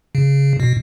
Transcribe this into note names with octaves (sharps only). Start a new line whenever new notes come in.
C#3
B2